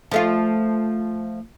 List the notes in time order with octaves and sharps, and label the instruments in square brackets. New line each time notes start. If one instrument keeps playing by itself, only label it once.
[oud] F3 A3 F4